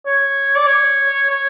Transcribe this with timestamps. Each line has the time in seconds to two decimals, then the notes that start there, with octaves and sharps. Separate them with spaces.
0.06 C#5
0.57 D5
0.67 C#5
1.30 C#5